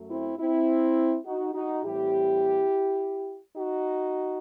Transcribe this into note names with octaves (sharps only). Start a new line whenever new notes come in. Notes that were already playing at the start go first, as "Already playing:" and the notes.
Already playing: F#2 F#3 A3
C4 E4
C4 E4
D#4 F#4
D#4 F#4
A2 E3 G3 C4 E4 G4
D#4 F#4